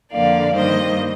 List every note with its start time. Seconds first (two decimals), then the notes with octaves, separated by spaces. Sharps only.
0.12 F2 D3 F3 A#3 D5 F5
0.56 G2 D#3 G3 A#3 C5 D#5